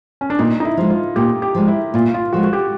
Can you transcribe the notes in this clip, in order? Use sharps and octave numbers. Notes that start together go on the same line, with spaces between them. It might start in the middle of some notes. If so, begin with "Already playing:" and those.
C#4
D4
A#2 D#4
D#4
E4
F3 G#3
F4
A#2 G4
G4
F3 G#3
E4
A#2 F4
F4
F3 G#3 F#4
F#4
G4